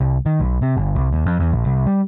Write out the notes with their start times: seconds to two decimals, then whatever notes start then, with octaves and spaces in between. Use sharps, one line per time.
0.01 C2
0.26 D#3
0.40 B1
0.62 C3
0.77 G1
0.96 C2
1.13 D#2
1.26 F2
1.40 E2
1.52 A#1
1.66 C2
1.86 G3